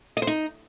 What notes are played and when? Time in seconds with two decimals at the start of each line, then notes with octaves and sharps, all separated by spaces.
0.17 D#5
0.22 C5
0.27 D#4